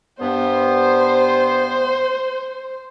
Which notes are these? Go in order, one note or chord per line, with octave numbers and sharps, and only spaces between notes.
G2 B3 C5